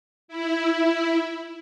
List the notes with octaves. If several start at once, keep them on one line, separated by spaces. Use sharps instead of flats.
E4